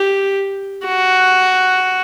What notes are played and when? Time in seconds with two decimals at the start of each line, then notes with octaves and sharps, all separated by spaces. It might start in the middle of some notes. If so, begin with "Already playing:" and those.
Already playing: G4
0.86 F#4